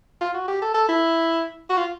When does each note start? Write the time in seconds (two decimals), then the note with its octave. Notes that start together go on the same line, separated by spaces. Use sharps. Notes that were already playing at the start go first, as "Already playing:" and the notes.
0.21 F4
0.34 F#4
0.48 G4
0.62 A4
0.74 A4
0.89 E4
1.69 F#4
1.77 F4